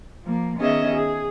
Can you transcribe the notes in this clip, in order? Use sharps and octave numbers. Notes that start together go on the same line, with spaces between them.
F3 A#3
D#3 B3 C#4 G#4 D#5 E5
G#4